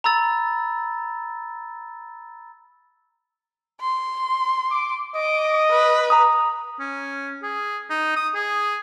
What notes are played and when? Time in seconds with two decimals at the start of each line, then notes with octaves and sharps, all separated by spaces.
0.04 A#5 B5 E6 A6
3.81 C6
4.71 D6
5.16 D#5 D6
5.70 B4
6.10 A#5 D#6
6.80 C#4
7.43 G#4
7.90 D#4
8.16 D#6
8.35 G#4